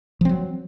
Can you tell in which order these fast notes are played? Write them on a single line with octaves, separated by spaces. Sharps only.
F3 C4 F#3